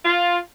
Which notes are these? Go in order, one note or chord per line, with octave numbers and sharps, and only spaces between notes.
F4